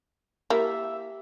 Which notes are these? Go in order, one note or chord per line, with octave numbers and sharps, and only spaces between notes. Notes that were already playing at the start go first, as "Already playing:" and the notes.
A#3 E4 G4 E5